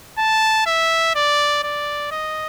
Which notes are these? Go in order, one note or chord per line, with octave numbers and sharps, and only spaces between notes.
A5
E5
D5
D5
D#5